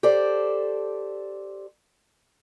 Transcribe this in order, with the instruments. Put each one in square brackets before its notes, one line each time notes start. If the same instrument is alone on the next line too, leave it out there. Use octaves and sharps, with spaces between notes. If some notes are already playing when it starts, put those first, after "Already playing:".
[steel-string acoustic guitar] G4 A4 C5 D5